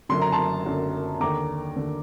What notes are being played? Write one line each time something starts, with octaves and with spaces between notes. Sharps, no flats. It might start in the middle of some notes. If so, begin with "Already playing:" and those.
F#1 F#2 D3 C6
A#5
A5 C6
F#1 F#2 D3
D#2 D3 A#5 D6
D#2 D3